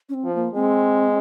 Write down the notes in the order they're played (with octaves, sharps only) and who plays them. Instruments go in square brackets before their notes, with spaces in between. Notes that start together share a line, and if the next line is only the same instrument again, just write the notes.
[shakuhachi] C#4
C4
[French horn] F3
[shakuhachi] A#3
[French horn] G#3 [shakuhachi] C4